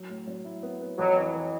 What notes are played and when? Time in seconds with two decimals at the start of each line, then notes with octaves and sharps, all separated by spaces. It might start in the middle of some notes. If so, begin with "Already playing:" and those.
Already playing: F#3
0.09 A2
0.27 F#3
0.45 E4
0.63 B3
0.81 B3
0.98 F2 F#3
1.17 E3
1.35 E3